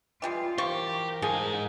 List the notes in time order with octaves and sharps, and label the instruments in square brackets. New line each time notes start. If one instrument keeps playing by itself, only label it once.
[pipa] E3 G3 G#3 [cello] F4
[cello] E3 A#4 [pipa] F4 C5 C#6 [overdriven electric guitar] G4
[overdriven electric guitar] G#2 G#5 [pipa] F3 [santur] G#4